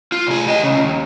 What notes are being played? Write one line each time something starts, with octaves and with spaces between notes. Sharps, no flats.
F4
C2 G#4
G4 D#5
C2 C#3
D#2